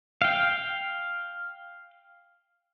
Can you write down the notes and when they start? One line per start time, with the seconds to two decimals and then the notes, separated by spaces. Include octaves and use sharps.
0.22 F5 G5